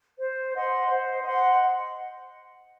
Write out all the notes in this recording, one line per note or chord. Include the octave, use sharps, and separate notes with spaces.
C5
D#5 F#5 C6
C5
D#5 F#5 C6